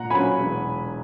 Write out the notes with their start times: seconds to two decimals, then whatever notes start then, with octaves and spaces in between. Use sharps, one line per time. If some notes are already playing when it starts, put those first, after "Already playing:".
Already playing: A#2 F#5 A#5
0.10 F#3 A#3 C#4 G#5 B5
0.38 E1